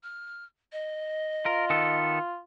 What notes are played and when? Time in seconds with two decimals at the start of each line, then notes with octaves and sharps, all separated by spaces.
0.03 F6
0.72 D#5
1.46 F4 A#4
1.70 D#3 B3 A4